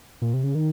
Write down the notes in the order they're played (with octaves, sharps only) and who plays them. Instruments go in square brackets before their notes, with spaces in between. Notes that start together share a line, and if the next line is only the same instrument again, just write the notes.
[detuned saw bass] A#2
C3
C#3
D#3